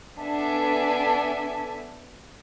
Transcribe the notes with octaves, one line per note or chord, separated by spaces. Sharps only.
B3 D4 A4 E5 G#5